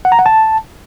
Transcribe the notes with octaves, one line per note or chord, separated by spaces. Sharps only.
F#5
A#5
F#5
A5